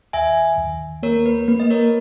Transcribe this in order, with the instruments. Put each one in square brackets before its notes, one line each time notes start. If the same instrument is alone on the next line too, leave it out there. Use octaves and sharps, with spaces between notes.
[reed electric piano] D#2 [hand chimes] E5 G#5
[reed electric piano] D#2
[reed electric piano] A#3 [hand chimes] A#4 C#5
[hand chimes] B4
[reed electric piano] A#3 [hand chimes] B4
[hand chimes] D#5
A#4 C#5